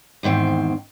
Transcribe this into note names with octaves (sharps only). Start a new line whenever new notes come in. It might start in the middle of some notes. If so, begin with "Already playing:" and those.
E2 G#2 D#3 C4